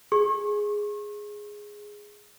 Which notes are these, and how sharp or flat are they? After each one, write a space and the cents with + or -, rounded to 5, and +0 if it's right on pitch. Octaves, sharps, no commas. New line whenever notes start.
G#4 +0 C#6 -40